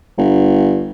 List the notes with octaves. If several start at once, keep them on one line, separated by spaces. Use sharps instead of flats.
G1